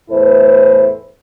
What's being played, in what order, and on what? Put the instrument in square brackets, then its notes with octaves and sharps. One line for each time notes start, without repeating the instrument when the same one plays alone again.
[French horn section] E2 A2 E4 A4 B4 C5